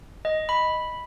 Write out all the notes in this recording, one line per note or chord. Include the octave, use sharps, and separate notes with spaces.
D#5
B5